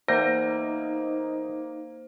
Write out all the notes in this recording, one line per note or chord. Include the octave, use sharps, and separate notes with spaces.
E2 A#3 D#4 C5 G6 A#6